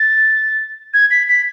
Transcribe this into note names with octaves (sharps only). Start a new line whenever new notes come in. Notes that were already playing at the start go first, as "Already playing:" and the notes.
Already playing: A6
G#6
B6
B6